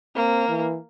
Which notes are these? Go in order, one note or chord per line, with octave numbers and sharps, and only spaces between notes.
A#3 C4
E3